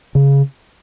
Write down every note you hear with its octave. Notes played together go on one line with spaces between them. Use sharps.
C#3